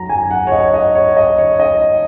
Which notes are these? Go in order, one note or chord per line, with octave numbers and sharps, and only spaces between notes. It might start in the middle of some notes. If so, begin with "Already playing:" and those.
Already playing: F#2 F#3 A#5
G#5
F#5
C#5
D#5
D#5
C#5
D#5
C#5
D#5